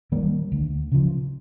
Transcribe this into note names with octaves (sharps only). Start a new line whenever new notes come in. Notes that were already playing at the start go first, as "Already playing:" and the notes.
D#3 G3 A#3
D2
C#3 F3